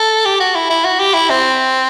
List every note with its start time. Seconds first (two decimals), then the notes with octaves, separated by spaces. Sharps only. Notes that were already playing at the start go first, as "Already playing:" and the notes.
Already playing: A4
0.26 G4
0.40 F#4
0.55 E4
0.70 E4
0.85 F#4
1.00 G4
1.14 E4
1.30 C4